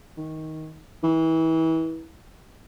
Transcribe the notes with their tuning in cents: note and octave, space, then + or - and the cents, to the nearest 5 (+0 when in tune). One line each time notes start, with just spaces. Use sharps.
D#3 +15
E3 -30